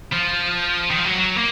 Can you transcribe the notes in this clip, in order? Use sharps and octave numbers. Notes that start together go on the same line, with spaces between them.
F3
D#3
F3
F#3
A#3